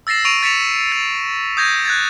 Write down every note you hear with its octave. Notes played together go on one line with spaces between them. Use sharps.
E6 A6 A#6 C7 E7
C#6 D7 D#7 F7
A6 B6 C#7 E7 F7
A6
D#6 G6 G#6 A#6 D#7
F#6 G#6 A6